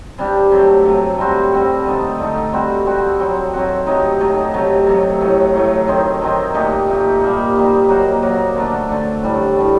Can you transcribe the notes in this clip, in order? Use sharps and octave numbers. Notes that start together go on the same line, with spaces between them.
C3 G3 D4 G4
C3 F#3 A3
C3 F#3 A3
G3 C4 F#4
G3 C4 F#4
D3 A3 D#4
D3 A3 D#4
G3 C4 F#4
G3 C4 F#4
F#3 C4 F#4
F#3 C4 F#4
C3 F#3 A3 D#4
C3 F#3 A3 D#4
C3 F#3 A3
C3 F#3 A3
A2 F#3 A3
A2 F#3 A3
D#3 F#3 C4 D#4
D#3 F#3 C4 D#4
A#2 A3 D#4 G4
A#2 A3 D#4 G4
G3 A#3 D#4
G3 A#3 D#4
F#3 A#3 F#4
F#3 A#3 F#4
D3 A3 D4
D3 A3 D4
A2 G3 D4
A2 G3 D4